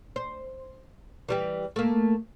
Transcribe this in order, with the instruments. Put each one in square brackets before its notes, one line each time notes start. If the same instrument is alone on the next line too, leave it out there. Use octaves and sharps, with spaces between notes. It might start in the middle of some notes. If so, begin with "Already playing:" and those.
[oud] C5
E3 G3 G4
A3 A#3